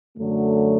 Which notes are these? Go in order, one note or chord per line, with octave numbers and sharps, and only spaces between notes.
F#2 D3 F#3 A3